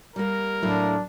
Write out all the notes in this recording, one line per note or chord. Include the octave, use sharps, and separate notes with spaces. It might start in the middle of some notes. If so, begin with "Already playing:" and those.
G3 A#3 A#4
A2 F#3 A#3 D4 E4